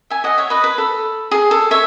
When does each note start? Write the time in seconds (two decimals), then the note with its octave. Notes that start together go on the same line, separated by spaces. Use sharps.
0.10 E5 G#5
0.24 D#5 F#5
0.37 C#5 E5
0.50 B4 D#5
0.64 B4
0.78 A4
1.31 G#4
1.51 A4
1.71 C#5 E5